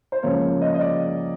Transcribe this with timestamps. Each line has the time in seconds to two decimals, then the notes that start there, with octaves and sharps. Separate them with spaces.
0.12 C5
0.23 C#2 C#3 F3 A#3 C#5
0.61 D#5
0.75 D#5
0.81 D5